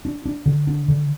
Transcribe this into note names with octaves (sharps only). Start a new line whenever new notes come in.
D4
D4
D3
D4
D3